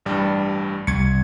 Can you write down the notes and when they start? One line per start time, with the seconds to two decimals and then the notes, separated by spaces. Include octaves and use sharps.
0.06 A1 G2 G3
0.87 C2 G#6 C#7